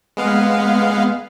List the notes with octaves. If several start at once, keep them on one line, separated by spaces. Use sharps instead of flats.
G#3 B3 F5